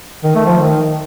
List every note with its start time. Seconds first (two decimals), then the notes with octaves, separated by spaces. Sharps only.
0.24 D#3
0.35 A3
0.46 F3
0.57 D#3